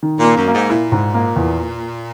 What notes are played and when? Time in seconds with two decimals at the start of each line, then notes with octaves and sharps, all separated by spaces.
0.03 D#3
0.20 A#2 A#3
0.36 F#2
0.47 A#3
0.53 G#2
0.70 A#2 E4
0.92 G#2
1.14 A#3
1.36 E2